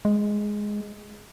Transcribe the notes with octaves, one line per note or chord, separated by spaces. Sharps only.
G#3